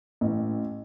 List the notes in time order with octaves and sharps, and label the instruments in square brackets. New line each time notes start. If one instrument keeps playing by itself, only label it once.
[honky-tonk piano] A1